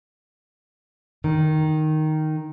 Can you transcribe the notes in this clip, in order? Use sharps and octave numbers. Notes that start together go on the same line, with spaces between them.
D#3